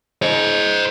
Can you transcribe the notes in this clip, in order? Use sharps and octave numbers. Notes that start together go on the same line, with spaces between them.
C5 D#5